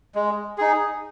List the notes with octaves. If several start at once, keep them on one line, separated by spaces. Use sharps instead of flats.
G#3
D#4 G#4